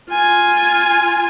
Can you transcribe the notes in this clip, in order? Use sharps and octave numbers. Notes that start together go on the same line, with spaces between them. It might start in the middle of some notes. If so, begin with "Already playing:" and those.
F4 G#5